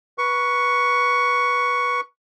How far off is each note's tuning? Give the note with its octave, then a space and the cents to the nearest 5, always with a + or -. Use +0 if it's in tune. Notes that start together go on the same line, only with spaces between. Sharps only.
B4 -15 C#6 +10